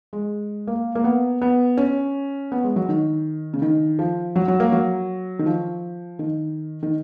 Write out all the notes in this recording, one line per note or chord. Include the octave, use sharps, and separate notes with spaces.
G#3
A#3
A#3
B3
B3
C#4
B3
G#3
F#3
D#3
C#3
D#3
F3
F#3
F#3
A#3
F#3
D#3
F3
D#3
D#3